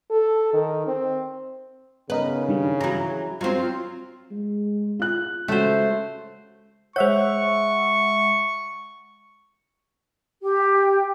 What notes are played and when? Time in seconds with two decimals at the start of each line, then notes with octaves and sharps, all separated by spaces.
0.11 A4
0.54 D#3
0.87 C4
2.10 C#3 B3 D#4 A#4 B4
2.49 G2 D#3 G3
2.81 E3 F#3 A#5
3.41 F#3 C4 F4 C5
4.31 G#3
4.99 F4 F#6
5.48 C#3 G#3 A3 C#4 F#4 C5
6.96 G#3 C5 C#5 E5 F#5 C#6
10.41 G4